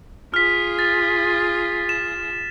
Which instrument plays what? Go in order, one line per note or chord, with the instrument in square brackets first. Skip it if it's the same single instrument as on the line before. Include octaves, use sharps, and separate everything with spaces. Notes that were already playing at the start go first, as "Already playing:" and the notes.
[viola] F4 G#4 [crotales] F6 B6
[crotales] A6
E7